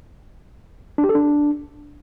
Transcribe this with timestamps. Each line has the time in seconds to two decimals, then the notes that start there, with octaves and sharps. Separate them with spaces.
0.98 D4
1.04 G4
1.09 A4
1.15 D4